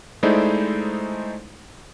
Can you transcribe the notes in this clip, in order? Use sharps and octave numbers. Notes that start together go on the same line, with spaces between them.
G#3 A3 D#4 E4 C5 D5